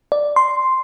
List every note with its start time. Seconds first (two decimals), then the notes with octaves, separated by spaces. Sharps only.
0.12 D5
0.36 C6